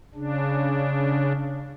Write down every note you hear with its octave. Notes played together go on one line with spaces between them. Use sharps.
C#3 D4